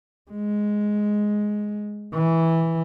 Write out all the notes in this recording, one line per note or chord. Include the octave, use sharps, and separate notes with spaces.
G#3
E3